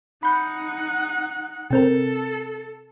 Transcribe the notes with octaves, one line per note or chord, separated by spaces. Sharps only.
D#4 F#5 B5 G6
C3 C4 A4 A#4